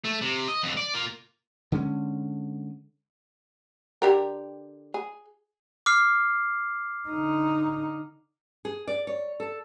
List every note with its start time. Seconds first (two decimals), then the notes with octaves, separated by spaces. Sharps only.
0.05 A3
0.22 C3
0.48 D#5
0.63 F2 D3
0.77 D5
0.94 A#3 F4
1.72 D3 G#3 C#4
4.02 D3 G4 A#4
4.94 G#4
5.86 D6 F6 C7
7.09 D3 D#4
8.65 G#4
8.88 D5
9.07 C#5
9.40 A4